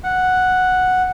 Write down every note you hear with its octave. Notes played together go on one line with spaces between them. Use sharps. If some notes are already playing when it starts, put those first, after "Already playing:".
F#5